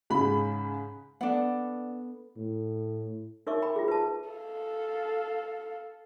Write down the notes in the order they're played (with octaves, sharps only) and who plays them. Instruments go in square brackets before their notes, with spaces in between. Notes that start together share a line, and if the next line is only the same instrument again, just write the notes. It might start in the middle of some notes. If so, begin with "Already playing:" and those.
[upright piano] G#2 C#3 G#3 B5
[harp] B3 A4 [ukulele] D4 F#5
[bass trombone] A2
[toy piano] D#4 A#4 C#5 E5 C#6 D6
G5 B5 D6
F4 G#4
B4 A5
[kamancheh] A4 F5